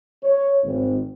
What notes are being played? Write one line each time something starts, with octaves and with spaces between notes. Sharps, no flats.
C#5
G#1